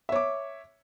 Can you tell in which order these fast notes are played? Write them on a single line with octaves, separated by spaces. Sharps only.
E5 C#5 D6